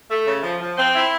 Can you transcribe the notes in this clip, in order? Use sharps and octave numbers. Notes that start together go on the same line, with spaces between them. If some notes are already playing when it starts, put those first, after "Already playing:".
A3
C#3
F3
F3
C4
E4